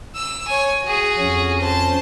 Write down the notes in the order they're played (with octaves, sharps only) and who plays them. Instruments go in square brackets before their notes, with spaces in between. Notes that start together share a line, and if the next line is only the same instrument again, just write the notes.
[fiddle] E6
C#5 G#5
F#4 G#4
[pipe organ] F2 C#4
[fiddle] C5 A5